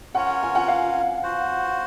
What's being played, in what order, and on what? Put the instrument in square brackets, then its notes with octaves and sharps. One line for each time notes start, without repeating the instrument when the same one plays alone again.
[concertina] C#4 F4 A#4 C#5 [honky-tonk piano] F#5
[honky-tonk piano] G#5
F#5
F5
[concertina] F#4 C5 F#5